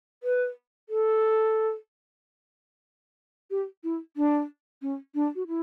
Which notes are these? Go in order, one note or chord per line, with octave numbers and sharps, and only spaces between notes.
B4
A4
G4
E4
D4
C#4
D4
F#4
E4